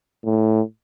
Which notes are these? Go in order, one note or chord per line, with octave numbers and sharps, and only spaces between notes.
A2